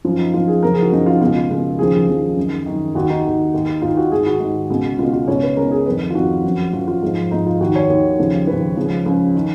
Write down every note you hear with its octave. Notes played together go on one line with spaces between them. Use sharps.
F#2 F3 F4
D#4
F#2 F3 F4
G#4
F#2 C#3 F3 A#4
G#4
F#4
F#2 C#3 F3 D#4
F4
C#2 B2 F4
C#2 B2
D#2 C#3 F3 G#4
D#2 C#3 F3
F#2 D#3
F#2 D#3
D#2 D#3 F#4
D#4
D#2 D#3
D#2 D#3
D#2 D#3 F4
F#4
G#2 D#3 G#4
F#4
G#2 D#3
C#2 B2
C#2 B2 F4
F4
C#2 B2 C#5
B4
C#2 B2 A#4
G#4
F2 D#3 B4
F4
F2 D#3 F#4
F#2 F3
F#2 F3 F4
F4
G#2 F3
G#2 F3 D#4
F4
D#2 D#3 F#4
C#5
D#2 D#3
D#2 C#3 F3
D#2 C#3 F3 B4
C#2 C#3 F3
C#2 C#3 F3
D#3